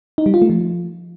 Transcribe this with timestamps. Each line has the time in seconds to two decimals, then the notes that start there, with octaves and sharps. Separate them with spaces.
0.18 D#4
0.26 G3
0.34 F4
0.42 A3
0.50 F3